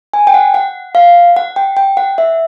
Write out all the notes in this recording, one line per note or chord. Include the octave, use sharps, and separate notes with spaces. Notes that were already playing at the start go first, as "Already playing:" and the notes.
G#5
G5
F#5
F#5
F5
F#5
G5
G5
F#5
E5